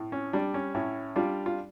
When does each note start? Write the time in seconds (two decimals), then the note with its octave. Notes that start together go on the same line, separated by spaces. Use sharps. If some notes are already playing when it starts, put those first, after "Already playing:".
Already playing: A2
0.12 C#4
0.33 G3 D4
0.54 C#4
0.75 A2 C#4 E4
1.16 G3 D4 F4
1.46 F4